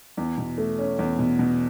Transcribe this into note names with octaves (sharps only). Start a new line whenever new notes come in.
E2
B2
A3
C#4
E2
B2
B2